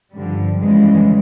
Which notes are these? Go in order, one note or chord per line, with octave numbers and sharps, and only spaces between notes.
G2 D3 F3 G3
F2 C#3 E3 G3 G#3